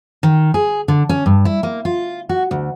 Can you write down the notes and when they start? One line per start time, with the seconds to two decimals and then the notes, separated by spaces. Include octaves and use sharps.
0.23 D#3
0.54 G#4
0.88 D3
1.09 C#4
1.26 G2
1.45 E4
1.63 A#3
1.85 F4
2.29 F#4
2.51 D2